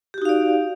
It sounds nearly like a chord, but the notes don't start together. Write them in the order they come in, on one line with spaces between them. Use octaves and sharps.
G4 F#4 D#4 F5 D5